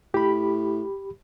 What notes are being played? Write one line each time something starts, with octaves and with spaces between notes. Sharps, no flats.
A2 G4 B5